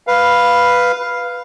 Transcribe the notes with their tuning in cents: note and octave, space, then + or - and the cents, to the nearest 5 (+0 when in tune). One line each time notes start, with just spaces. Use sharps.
B4 +0 F5 +0